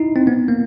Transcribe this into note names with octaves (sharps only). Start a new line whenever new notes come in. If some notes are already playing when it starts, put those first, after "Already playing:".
Already playing: D#4 E4
C4
B3
A#3